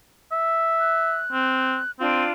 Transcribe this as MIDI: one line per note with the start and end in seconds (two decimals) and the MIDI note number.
0.32 1.22 76
0.79 1.90 90
1.32 1.80 60
2.00 2.25 60
2.00 2.32 62
2.00 2.32 65